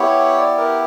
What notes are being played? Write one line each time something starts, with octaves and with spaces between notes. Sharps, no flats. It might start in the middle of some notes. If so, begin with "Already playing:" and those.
Already playing: B3 E4 G4 C#5
D5
A#4